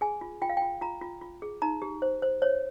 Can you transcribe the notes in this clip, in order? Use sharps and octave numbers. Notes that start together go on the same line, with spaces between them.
G#4 G#5
F4
F4 G5
F5
F4 G5
F4 A#5
F4
F4
G#4
D#4 A#5
G4
C5
C5
C5 C#5